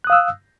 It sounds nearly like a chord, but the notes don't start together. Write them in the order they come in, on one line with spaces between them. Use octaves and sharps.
F#6 D#6 F5 E6